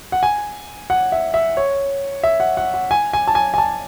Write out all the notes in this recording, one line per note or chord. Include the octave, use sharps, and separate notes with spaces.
F#5
G#5
F#5
E5
E5
C#5
E5
F#5
F#5
F#5
G#5
G#5
A5
G#5
G#5
A5